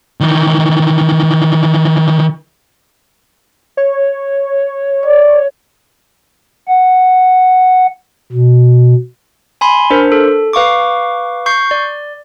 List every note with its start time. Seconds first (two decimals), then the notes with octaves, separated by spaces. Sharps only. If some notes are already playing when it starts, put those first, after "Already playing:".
0.20 D#3 E3
3.77 C#5
5.06 D5
6.68 F#5
8.32 B2
9.61 G#5 B5 C6
9.90 D4 A#4 C5
10.12 A4
10.53 B4 F5 C#6 D6
11.46 C#6 G6 C7
11.71 D5